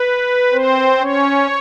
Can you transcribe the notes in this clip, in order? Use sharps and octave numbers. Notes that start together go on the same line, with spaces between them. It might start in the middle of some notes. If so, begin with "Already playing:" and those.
Already playing: B4
C4 C5
C#4 C#5